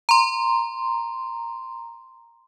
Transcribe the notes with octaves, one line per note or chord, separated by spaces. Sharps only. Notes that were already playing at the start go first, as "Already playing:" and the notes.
A#5 C6